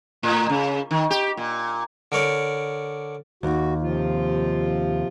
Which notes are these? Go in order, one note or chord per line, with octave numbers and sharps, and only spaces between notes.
A2
C#3
D#3
G4
A#2
D3 A#4 C#5 D5
D#2 F#4
C3 F3 F4